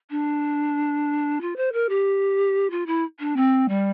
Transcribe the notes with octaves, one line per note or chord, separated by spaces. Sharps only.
D4
F4
C5
A#4
G4
F4
E4
D4
C4
G3